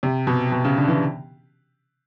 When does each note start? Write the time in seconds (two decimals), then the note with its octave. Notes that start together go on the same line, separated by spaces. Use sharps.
0.03 C3
0.27 B2
0.52 B2
0.64 C#3
0.77 D3
0.88 E3